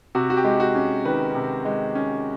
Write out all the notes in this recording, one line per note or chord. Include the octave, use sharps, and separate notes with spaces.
C3 F#4
F#4
G4
G#3
F#4
C#4
D#3 B4
C3
G#3
C#4